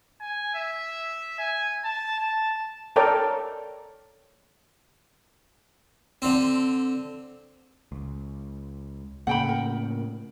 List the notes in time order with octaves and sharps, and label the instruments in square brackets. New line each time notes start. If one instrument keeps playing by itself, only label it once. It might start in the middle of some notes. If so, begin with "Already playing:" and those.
[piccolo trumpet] G#5
E5
G#5
A5
A5
[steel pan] A4 A#4 C#5 D5 G5
[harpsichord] D3 C4
[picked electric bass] C#2
[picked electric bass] A2 C#3 A#3 [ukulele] F#5 G5 B5
[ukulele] A#4